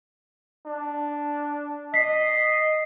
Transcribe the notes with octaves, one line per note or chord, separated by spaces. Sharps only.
D4
D#5 B6 C7